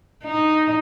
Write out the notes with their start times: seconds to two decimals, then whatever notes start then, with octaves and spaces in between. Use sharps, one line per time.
0.24 D#4